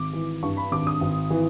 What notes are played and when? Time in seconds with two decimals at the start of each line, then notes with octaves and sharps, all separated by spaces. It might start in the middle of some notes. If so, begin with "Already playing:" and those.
Already playing: G#1 D6
0.13 E3
0.43 G2 C#6
0.57 B5
0.72 G#1 D6
0.87 D#6
1.01 G#1
1.30 E3